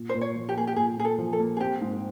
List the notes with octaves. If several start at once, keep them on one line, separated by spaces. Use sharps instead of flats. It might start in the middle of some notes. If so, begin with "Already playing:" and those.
Already playing: A#2
C5
A#2
C#5
F3
G4
A#3 G#4
G4
A#2 G#4
A#2 G#4
A4
F3
A4
A#3
G#4
C4 G4
G#2